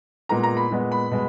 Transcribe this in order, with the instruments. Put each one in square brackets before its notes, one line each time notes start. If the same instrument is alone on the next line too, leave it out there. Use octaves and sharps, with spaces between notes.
[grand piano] A#2 G#3 B3 A#5
A#5
B5
A#2 G#3 B3
B5
B2 G#3